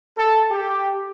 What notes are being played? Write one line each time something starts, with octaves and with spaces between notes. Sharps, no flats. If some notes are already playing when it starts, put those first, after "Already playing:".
A4
G4